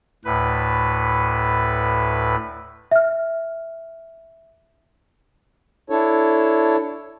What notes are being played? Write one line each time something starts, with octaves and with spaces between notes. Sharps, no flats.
D2 A2 B4
E5 F6
D4 E4 A4 C#5